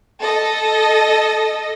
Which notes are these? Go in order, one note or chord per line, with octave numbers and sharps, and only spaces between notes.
A4 D#5